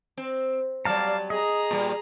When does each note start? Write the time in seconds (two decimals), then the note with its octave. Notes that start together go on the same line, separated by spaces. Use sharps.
0.17 C4
0.85 F#3 G3 D5 F5 A5 A#5
1.30 G#4 D#5 A#5
1.71 A#2 G3